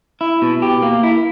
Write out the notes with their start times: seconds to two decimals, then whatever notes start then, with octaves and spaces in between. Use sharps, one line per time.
0.21 E4
0.42 B2
0.62 G4
0.83 A#3
1.03 E4